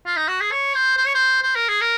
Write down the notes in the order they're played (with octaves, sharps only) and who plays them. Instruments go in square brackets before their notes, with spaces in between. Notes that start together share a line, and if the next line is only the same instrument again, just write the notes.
[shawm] F4
D#4
F#4
G#4
C#5
C5
C5
C#5
C5
C5
A#4
G#4
A#4